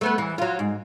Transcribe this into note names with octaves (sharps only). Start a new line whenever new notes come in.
A3 B3 B4
E2 E3
F#3 F4
G#2